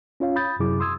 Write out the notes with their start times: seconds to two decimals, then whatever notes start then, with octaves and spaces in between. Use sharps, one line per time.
0.20 C#4 F4 C#5 F5
0.36 B5 D#6 G6 A6
0.59 F#2 C3 F#3 E4 G#4 D6
0.80 C6 D#6 E6 G#6